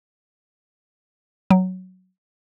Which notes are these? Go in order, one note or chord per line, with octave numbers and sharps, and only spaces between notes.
F#3